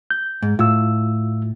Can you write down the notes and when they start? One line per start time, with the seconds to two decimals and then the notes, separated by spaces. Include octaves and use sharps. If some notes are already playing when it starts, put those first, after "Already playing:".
0.10 G6
0.42 G#2
0.59 A2 F4 E6